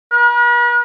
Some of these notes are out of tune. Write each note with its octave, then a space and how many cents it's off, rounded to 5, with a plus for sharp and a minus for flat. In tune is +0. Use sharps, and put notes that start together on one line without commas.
B4 -45